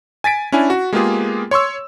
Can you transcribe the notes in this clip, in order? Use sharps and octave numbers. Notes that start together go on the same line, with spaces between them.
G#5 A6 B6 D7
C#4 D4 E4 G#5
F#4
G#3 A#3 B3 F4 G4 G#4
C#5 C6 C#6 E6